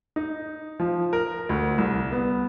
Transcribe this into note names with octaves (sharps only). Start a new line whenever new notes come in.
D#4
F3
A#4
D2
C2
B3